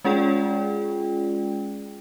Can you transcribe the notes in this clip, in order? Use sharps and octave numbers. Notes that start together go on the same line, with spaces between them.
G#3 C#4 F4 G#4 D5 G5